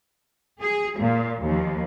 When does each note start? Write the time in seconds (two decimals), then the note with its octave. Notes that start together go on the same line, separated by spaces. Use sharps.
0.62 G#4
0.98 A#2
1.42 D#2 F3